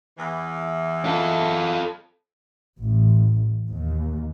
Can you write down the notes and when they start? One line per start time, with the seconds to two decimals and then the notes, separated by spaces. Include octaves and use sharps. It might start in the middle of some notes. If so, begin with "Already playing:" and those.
0.18 E2 E3
1.05 F4 A4
2.80 A1
3.68 D#2